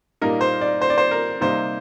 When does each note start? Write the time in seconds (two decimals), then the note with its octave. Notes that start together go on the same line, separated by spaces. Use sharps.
0.21 A#2 G3 A#3 D#4 A#4
0.41 C5
0.61 D5
0.81 C5
0.90 D5
0.98 C5
1.11 A#4
1.41 C3 G3 A#3 D#4 C5